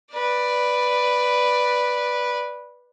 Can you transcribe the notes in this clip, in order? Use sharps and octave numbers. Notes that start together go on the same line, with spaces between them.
B4 D5